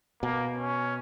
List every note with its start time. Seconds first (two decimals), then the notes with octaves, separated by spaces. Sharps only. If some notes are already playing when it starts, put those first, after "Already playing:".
0.23 B2 A#3
0.57 C#4